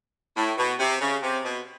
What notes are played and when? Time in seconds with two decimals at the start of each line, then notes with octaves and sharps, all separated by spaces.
0.37 A2
0.57 B2
0.79 C3
1.01 C#3
1.22 C3
1.44 B2